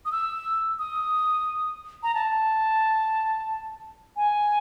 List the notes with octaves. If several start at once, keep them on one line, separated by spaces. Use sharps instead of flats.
D#6
E6
D#6
A#5
A5
G#5